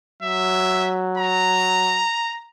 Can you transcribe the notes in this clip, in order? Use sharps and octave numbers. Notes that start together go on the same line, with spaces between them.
F#3 E5
A#5